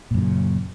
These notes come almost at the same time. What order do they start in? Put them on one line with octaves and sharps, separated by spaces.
A#2 F#2 E3 C#3